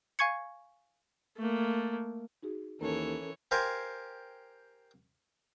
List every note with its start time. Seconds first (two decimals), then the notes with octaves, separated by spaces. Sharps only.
0.19 F5 G#5 C#6 G#6 C#7
1.37 A3 A#3
2.43 D#4 F#4 G#4
2.81 D#2 E3 C#4 A4 A#4 C#5
3.51 G4 A#4 C5 F5 G#5